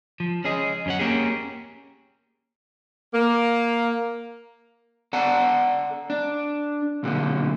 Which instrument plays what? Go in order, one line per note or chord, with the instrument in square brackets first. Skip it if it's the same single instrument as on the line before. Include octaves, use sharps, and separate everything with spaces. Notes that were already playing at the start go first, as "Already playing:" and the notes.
[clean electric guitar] F3
C#4 G#4 D#5
F#2 C#4 F#5
A#3 C#4 G4 G#4
[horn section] A#3
[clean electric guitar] A4 D5 F#5 A5 A#5
D4
B1 A#2 D3